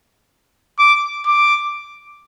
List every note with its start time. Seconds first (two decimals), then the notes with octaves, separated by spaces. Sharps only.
0.79 D6
1.27 D6